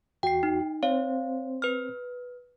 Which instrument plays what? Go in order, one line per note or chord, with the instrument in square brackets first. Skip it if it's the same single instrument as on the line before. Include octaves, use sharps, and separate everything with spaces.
[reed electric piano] E2 F#4 [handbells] G5 C7
[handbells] D#4
[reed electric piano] C4 C5 [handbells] C#5 F5
[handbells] B4 F6